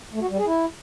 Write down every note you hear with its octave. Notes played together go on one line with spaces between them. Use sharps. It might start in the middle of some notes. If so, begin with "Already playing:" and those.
A3
F#4
G3
G#4
E4